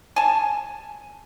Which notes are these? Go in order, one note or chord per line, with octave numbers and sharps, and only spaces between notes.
G#5 A5